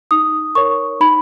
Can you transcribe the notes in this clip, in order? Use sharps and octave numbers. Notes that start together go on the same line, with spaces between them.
D#4 D#6
A#4 C#5 C#6
D#4 B5